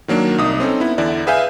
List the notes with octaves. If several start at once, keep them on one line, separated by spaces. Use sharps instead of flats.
D#3 F#3 A#3 D4
C2 D#4 D#6
C4 C#4 D#4 A4
B3 E4
E2 D3 E4 D5
G#4 B4 E5 F5 G#5 G6